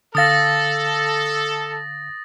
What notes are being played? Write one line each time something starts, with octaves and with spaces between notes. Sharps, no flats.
D3 A4 F5 D#6 A6 A#6